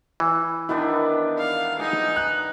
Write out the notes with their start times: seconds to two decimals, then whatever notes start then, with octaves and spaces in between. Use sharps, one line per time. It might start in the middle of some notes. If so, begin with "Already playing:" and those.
0.20 E3
0.69 D#3 B3 D4 E4
1.38 F5
1.80 D#4 G#4
2.16 F#6